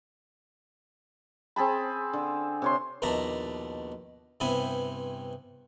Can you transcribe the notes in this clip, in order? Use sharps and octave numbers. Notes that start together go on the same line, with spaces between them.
C4 G#4 A5 B5
D3
C3 C#5 C6
A#1 D#2 B2 D4 E5 A#5
G2 C3 B3 C4 E4 G#5